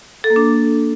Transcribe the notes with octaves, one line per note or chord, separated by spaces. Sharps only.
A4
A#3
D4